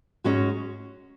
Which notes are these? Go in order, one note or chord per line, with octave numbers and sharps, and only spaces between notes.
G#2 G#3 C#4 F#4